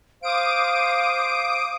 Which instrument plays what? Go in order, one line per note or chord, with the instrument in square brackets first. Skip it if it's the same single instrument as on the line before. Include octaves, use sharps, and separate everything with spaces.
[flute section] C5 F5 [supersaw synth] D6 D#6 D7